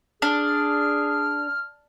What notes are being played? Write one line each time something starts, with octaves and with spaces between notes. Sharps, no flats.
D4 G#4 F6